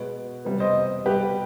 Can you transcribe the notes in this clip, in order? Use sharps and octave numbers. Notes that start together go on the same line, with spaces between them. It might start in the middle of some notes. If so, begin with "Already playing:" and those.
Already playing: B2 G#3 B3
C3 G3 B3
C5 D#5
B2 G3 B3 G4 B4